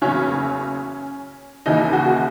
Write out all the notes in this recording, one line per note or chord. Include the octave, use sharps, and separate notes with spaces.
F#1 E2 C#3 F#3 C#4
D#2 C#3 E3 D#4
F#4